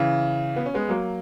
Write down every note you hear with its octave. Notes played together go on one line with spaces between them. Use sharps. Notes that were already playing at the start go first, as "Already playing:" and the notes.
Already playing: C#3 E3
B3
C#4
G#3 B3
F#3 A#3